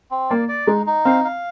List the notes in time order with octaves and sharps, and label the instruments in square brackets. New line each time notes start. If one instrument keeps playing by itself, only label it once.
[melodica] C4
[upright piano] A#3 [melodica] D5
[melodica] D5
[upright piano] G#3 [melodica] D#4
[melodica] D#4
[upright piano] C4 [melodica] F5
[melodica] F5